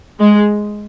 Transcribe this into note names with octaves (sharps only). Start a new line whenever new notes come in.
G#3